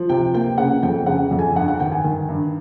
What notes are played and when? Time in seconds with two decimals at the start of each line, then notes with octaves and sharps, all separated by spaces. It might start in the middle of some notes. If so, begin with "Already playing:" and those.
Already playing: F3
0.09 C3 G5
0.34 A#3 G5
0.58 C#3 F#5
0.83 F2 G5
1.06 C#3 F#5
1.31 F2
1.39 G#5
1.55 G2 F#5
1.68 F#5
1.80 D#3 G5
1.92 G#5
2.04 D#3
2.29 G2